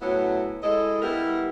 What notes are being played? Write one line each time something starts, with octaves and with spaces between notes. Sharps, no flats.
A2 F#3 B3 C#4 E4
G#3 E4 A4 D#5
G3 B3 E4 G4 A#4